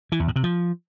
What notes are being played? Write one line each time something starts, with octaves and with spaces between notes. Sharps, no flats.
E3
E2
A2
C3
F3